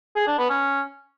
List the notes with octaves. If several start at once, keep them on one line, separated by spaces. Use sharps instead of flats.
G#4
D4
B3
C#4